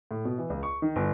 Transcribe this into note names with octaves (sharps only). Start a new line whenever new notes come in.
A2
B2
E3
C#2
C#6
D#3
G1